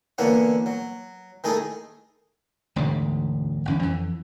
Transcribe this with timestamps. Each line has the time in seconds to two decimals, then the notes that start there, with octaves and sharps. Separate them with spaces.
0.18 D3 E3 A#3 B3 E4 C#5
0.66 F#3
1.44 D#3 A3 E4 G#4 A4 D#5
2.76 E1 D2 G#2 B2
3.65 G1 E2 C#4
3.82 F2 E3